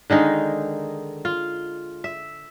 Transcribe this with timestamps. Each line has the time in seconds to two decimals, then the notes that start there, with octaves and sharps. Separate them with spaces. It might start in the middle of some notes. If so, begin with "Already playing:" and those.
0.10 D3 D#3 G#3 D#4
1.25 F4
2.04 E5